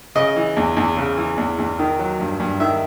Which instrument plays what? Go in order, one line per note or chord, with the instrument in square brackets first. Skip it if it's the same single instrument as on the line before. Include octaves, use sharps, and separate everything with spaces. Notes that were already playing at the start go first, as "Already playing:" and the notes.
[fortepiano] C#3 D#5
E3
E2
E2
C#3
E3
E2
E2
D#3
F#3
G2
G2
D#3 E5